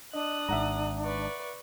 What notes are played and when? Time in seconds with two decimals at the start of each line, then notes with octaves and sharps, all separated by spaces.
0.13 D4 D#5 D#6 F#6
0.49 G#1 G#2 E5 F#5 A#5
1.04 B4 D5 C#6